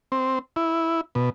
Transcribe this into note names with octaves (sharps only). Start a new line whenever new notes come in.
C4
E4
B2